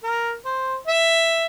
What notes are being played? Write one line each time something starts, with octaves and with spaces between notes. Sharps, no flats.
A#4
C5
E5